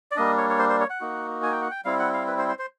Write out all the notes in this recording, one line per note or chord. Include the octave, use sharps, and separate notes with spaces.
D5
G3 A#3 D4 D#5
C#5
C#5
C5
C5
C#5
F#5
A#3 D#4 F#4
G#5
G5
F#5
G5
G3 C4 E4 F5
F#5
F5
B4
C5
C5
C5